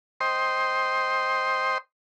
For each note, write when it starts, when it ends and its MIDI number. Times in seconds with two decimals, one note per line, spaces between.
0.21 1.78 72
0.21 1.78 75
0.21 1.78 79
0.21 1.78 84